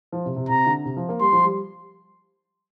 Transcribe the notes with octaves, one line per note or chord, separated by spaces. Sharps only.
F3
C3
C3
C3 A#5
D3
C3
F3
A#3
G3 C6
F3
G3